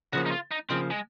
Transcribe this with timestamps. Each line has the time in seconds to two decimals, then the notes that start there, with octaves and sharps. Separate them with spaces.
0.13 C#3 F3 A#3 F#4
0.26 D#4
0.32 F4
0.51 D#4
0.69 C#3 F3 A#3 C4
0.91 G#3